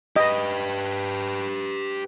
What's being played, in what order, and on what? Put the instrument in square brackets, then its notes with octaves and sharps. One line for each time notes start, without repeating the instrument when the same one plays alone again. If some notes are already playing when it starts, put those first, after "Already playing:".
[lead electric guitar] G4 B4 [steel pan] D#5